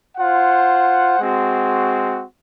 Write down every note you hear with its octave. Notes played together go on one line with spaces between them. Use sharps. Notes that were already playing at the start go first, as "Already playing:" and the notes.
F4 C5 F#5
G#3 C4 F#4